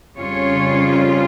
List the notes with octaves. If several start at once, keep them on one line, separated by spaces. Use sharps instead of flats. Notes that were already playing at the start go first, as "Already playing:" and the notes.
F2 C#3 G3 C#4 F4 C#5